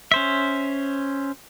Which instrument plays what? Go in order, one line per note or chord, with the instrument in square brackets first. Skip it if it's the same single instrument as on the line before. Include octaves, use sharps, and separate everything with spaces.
[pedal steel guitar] C#4 C5 E5